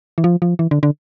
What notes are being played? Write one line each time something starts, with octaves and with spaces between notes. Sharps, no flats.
E3
F3
F3
E3
D3
D3